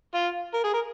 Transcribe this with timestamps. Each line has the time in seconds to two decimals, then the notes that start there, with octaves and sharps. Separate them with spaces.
0.15 F4
0.54 A#4
0.64 G#4
0.74 A#4